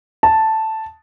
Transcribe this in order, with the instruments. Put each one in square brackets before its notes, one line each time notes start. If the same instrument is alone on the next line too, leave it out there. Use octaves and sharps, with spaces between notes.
[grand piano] A5